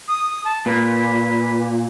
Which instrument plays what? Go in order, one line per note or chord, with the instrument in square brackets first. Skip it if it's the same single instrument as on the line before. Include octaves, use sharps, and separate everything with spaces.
[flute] D#6
A5
[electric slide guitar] A#2 [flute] B4